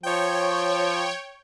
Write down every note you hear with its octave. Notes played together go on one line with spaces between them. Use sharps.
F3 C#5 G5